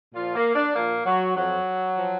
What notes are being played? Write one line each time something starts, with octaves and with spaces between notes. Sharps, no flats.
A#2 F3 F4
A#3
D4
A#2 F3 A#3
F#3
F2 F3 F#3
F3